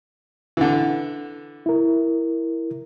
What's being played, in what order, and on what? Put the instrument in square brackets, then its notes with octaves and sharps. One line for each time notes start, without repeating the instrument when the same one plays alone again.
[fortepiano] D3 E3
[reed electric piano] E4 A#4